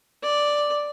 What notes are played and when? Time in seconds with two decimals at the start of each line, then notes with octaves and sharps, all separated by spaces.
0.23 D5